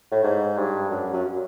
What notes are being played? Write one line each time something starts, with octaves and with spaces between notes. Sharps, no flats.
A2
G#2
G2
F#2
F#2